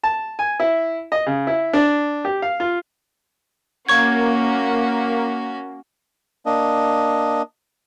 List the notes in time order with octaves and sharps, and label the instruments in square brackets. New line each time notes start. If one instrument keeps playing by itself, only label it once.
[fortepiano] A5
G#5
E4
D#5
C#3
E4
D4
G4
F5
F4
[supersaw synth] A#3 [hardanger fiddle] C#4 F#4 [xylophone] C#6 G#6
[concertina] A#3 D4 D#5